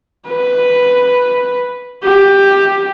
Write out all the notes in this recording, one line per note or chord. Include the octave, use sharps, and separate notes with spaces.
B4
G4